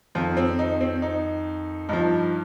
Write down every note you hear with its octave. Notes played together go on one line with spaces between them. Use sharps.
F2 D#3 F3 F4
C4
D#4
C4
D#4
G2 F3 D#4